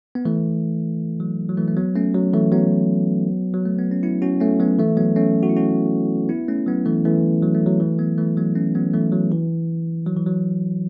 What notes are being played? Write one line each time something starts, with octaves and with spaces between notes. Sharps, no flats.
B3
E3 A3
F#3
F#3
E3 A3
A3
F#3 B3
A3 C#4
F#3
E3 A3
F#3 B3
F#3
A3
B3
C#4
B3 E4
C#4 F#4
A3 C#4
F#3 B3
E3 A3
F#3 B3
A3 C#4
F#4
E4
C#4 F#4
B3 E4
A3 C#4
F#3 B3
E3 A3
E3 A3
F#3
A3
F#3
E3 A3
F#3 B3
E3 A3
F#3 B3
A3 C#4
F#3 B3
E3 A3
F#3
E3
F#3
E3
F#3